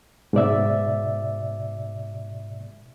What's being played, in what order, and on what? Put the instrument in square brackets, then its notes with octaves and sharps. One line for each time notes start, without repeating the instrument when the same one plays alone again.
[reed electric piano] G#2 B2 D5 E5